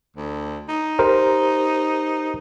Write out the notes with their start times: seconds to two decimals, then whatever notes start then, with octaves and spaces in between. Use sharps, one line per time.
0.17 D2
0.69 D#4
0.99 G4 A#4 C5